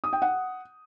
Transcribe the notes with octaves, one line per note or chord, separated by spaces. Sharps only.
D#6
G5
F#5